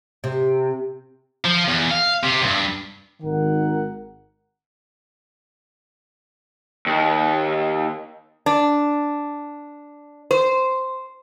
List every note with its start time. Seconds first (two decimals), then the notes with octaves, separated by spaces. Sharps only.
0.24 C3
1.45 F3
1.68 E2
1.91 F5
2.24 C3
2.42 C#2 G2
3.23 G#1 D#3 A#4 F#5
6.86 D#2
8.46 D4
10.31 C5